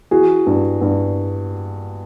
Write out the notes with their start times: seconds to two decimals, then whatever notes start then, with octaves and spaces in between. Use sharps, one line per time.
0.11 E3 F#4 G#4
0.47 G2
0.81 G2